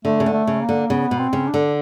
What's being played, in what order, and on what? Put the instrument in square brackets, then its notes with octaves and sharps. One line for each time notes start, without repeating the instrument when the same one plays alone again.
[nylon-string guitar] D3 [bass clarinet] A3
[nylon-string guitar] C#3
D3
[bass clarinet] A3
[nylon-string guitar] C#3
[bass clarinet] A#3
[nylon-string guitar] D3
[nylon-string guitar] C#3 [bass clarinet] B3
[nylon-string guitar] B2
[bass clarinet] C4
[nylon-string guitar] C#3
[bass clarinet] D4
[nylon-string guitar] D3